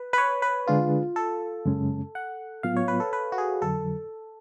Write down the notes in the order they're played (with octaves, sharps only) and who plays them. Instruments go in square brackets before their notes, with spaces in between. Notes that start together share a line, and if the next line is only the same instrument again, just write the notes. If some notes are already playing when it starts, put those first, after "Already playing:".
Already playing: [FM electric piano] B4
B4
C#5
B4
[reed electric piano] D3 G#3 D4 G#4 B4 [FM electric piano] F4
[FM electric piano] A4
[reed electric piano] F#2 C#3 G#3 C#4
[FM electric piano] F#5
[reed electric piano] A2 F#3 B3 F4 [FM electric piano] F5
[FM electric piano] C#5
B4
A4
B4
F#4
G#4
[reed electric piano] F2 D3 F#3 [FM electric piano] A4